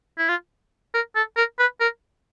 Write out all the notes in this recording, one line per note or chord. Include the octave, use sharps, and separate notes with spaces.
E4
F4
A#4
A4
A#4
B4
A#4